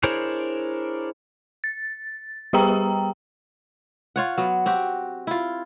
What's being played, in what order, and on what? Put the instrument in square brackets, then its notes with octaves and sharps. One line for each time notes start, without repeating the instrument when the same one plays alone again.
[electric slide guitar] D4 E4 G#4 A#4 C5 C#5
[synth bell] A6
G3 G4 G#4 G5 A#5
[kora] F4 C#5 F#5
F#3 B3
C4 F#4 G4
E4 F4